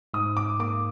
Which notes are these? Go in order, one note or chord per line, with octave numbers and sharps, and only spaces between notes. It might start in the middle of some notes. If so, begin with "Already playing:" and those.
G#2 D#6
D6
A#3 D6